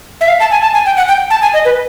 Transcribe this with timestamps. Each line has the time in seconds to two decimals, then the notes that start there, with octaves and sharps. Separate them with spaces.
0.21 E5
0.28 F5
0.40 A5
0.51 G#5
0.62 A5
0.74 G#5
0.86 G5
0.97 F#5
1.08 G5
1.30 A5
1.42 G#5
1.54 D#5
1.65 B4